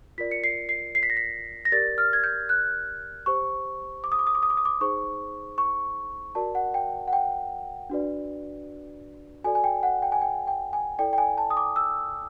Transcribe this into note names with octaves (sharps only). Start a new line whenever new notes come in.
F4 A#4 D5 B6
C#7
C7
C7
C7
B6
A#6
B6
A#6
G4 A#4 D5 A6
F6
G#6
G6
F#6
G4 C5 C#6
D6
D#6
D6
D#6
D6
D#6
D6
D#6
D6
D#4 G#4 C5 C#6
C#6
F#4 A#4 D5 A5
F#5
G5
F#5
G5
D4 F#4 B4 D5
F#4 A4 D5 G#5
G#5
G5
F#5
G5
G#5
G5
G5
G#5
E4 A4 D5 G5
G5
G#5
A5
D#6
D6
E6